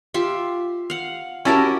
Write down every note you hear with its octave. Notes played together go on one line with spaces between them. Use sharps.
F4 G4 E5
F5 F#5
C#4 E4 F#4 G4 A#4 A5